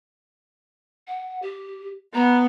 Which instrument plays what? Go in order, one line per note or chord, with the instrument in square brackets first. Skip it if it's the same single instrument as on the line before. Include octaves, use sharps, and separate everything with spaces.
[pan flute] F#5
G4
[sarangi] B3 [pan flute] A#5